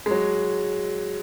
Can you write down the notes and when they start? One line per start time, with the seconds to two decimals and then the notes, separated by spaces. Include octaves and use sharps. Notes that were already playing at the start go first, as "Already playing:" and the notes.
0.06 G#3
0.11 F#3